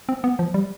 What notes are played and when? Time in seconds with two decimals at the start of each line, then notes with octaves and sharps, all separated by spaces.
0.09 C4
0.24 B3
0.39 F3
0.54 G3